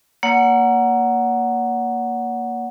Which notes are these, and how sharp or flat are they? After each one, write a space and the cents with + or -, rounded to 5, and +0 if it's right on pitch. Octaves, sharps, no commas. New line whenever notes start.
A#3 +0 C#5 +45 F#5 +0